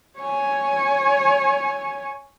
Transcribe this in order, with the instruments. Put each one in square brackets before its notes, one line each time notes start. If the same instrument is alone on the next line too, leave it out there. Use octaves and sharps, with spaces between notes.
[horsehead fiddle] C#5 G#5